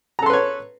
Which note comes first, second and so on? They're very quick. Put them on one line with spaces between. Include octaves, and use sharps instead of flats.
A#5 A4 C6 B4 C#5